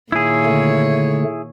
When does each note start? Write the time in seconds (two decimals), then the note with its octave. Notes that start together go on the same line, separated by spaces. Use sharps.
0.12 A#2 D#3 E4 G#4 C#5
0.46 D3 A3